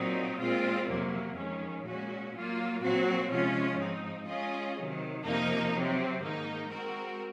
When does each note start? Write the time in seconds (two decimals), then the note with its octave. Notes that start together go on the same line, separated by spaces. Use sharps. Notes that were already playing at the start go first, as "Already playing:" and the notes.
Already playing: A#2 F#3 C4 D#4
0.38 A#2 G#3 C4 F4
0.87 F2 C3 F#3 A#3
1.35 F2 D#3 G#3 C#4
1.84 A#2 G#3 C#4 F#4
2.33 F#3 A#3 F4
2.82 A#2 F#3 C4 F#4
3.30 C3 F3 G#3 C#4 F4
3.79 G#2 F3 C4 D#4
4.27 G#3 C#4 F4 G#4 D#5
4.77 C3 D#3 F#3
5.25 F2 C3 F3 A#3 D#4
5.75 C3 F#3 C4
6.23 G#2 D#3 A#3 D#4
6.71 G#3 C4 F#4 A#4